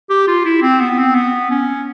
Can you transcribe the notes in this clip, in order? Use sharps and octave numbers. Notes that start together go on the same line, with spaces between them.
G4
F4
E4
C4
B3
C4
B3
C#4